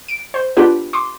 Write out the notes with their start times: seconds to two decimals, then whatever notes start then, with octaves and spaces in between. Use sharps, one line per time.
0.08 D7
0.34 C5
0.57 B3 D4 F4 G4 B4
0.93 C6 D6